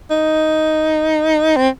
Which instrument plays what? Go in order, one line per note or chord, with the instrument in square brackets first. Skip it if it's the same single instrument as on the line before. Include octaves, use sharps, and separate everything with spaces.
[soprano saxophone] D#4
C4